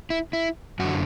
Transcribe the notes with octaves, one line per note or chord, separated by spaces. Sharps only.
E4
E4
F#2 D3 F#4